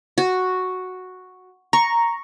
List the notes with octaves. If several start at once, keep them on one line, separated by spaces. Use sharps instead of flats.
F#4
A#5 C#6